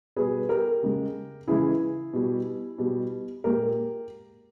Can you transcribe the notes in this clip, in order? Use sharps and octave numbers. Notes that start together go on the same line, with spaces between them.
B2 G3 G#4 B4
G4 A#4
C#3 G#3
C#3 E3 G#3 E4 G#4
B2 G3
B2 G3
A#2 G#3 G4 A#4